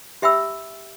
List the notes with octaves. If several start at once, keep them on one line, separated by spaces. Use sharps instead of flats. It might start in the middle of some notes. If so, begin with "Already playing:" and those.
G4 E5 G5 B5 E6